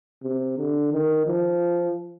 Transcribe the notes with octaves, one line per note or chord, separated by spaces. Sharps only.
C3
D3
D#3
F3